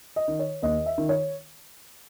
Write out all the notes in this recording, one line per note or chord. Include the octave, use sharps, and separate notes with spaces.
D#5
D#3
C#5
D#2 D#5
E5
D#3
C#5